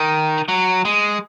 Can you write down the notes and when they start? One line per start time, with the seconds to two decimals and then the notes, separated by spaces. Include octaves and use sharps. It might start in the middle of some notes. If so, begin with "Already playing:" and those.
Already playing: D#3
0.48 F#3
0.85 G#3